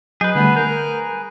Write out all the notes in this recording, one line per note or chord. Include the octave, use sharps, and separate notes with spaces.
F#3 G#4 B4 D#5 G6
D3 G3 A3 B3
A#4 G6